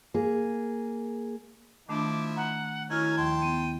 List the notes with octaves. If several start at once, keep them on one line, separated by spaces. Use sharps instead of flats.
A#3 G#4
D#3 F3 A3 D4 E4 D6
F#5 A#5
D#3 F#3 C#4 E4 A#4 F6 G#6
D#2 D#3 F3 G5 A5 C6
B3 D#7